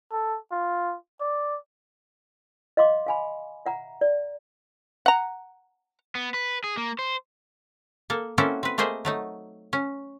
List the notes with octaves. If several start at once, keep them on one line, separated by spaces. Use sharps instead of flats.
A4
F4
D5
D#5 F5 C6 D6
F5 G#5 B5
E5 F#5 A#5
D5
F#5 A#5
B3
B4
G#4
A#3
C5
A#3 A4
A#3 C4 C#4 E4 F#4 A4
C4 B4
A3 A#3 G#4 C5 D#5 E5
F#3 A3 D#4
C#4